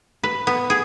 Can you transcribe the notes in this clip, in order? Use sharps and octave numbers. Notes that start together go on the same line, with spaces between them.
B4
B3
G#4